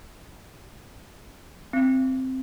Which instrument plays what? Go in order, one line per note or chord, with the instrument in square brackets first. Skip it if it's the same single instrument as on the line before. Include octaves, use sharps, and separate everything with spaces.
[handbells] C4